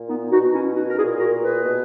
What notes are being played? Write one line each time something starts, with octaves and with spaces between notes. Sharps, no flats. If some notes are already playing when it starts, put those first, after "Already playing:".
Already playing: A#2
B3 D#4
B2 D#4 F#4
C#4 E4
D#4 F#4
A#4
A#2 E4 G#4
F#4 A#4
G#4 B4
B2